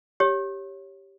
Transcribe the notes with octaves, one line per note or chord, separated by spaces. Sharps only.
G4 C#5